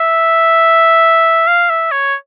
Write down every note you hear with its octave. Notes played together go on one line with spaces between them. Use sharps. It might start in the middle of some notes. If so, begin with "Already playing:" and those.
Already playing: E5
F5
E5
C#5